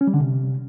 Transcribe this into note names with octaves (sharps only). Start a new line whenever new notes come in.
C#4
G3
D3
C3